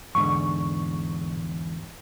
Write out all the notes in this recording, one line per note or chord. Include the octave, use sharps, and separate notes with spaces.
E2 G#2 D3 C#6